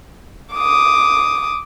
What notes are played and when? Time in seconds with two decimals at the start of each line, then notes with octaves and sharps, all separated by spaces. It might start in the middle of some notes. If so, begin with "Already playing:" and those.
0.55 D6 D#6